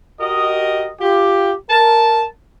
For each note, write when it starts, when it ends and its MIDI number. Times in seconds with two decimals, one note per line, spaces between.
0.20 0.89 66
0.20 0.89 67
0.20 0.89 70
0.20 0.89 75
1.01 1.53 65
1.01 1.53 67
1.70 2.26 70
1.70 2.26 81